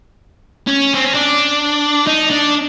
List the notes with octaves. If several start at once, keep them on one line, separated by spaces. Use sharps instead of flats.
C#4
C4
C#4
D4
D#4
D4